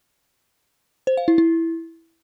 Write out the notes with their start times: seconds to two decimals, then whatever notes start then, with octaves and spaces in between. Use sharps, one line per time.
1.07 C5
1.17 F5
1.28 E4
1.38 E4